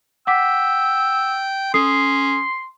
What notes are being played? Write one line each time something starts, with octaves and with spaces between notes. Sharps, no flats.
F#5 G5 D6 E6 B6
C#4 A4 C6 D#6 C7